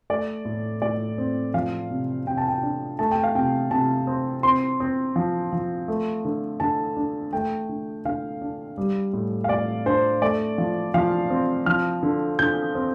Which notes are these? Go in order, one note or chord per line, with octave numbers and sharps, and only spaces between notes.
A3 D5
A2
A2 D5
C4
F3 F5
C3
C3 G5
A5
G5
D4
A3 A5
G5
F5
C3 G5
C3 A5
C4
C4 C6
C4
F3
F3
A3
D3
D3 A5
D4
A3 G5
D3
D3 F5
D4
G3
A2
F5
A2 D5
D4 C5
A3 D5
F3
F3 F5
C4
F3 F6
D3
D3 G6
C4